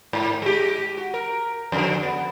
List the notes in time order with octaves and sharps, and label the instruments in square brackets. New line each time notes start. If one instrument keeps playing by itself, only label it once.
[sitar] G#2
G#3 G4
F#4
A#4
F2 G#2 D3
B3